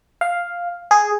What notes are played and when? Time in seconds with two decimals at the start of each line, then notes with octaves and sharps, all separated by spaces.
0.21 F5
0.91 G#4